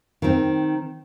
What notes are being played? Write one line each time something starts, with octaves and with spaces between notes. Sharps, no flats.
D#3 C4